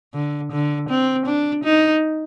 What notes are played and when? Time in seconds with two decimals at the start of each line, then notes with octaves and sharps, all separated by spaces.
0.14 D3
0.52 D3
0.89 C4
1.26 D4
1.64 D#4